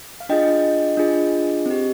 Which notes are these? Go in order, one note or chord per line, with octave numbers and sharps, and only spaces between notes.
F5
D4 F4 G#4 D#5 G5
D4 F4 G#4
C4 G4